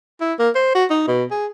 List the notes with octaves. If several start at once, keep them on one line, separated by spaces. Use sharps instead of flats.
E4
A#3
C5
F#4
D#4
B2
G#4